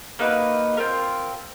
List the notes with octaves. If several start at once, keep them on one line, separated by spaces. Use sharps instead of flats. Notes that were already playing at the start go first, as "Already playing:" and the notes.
A#3 D#4 F#4 B4
C4 F4 A#4